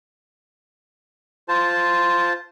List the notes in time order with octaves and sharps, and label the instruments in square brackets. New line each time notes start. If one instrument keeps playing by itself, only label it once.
[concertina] F4 C5 A5